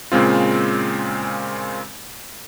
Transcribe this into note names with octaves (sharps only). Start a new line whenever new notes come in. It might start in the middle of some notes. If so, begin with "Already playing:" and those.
A#2 C#3 G#3 C4 F4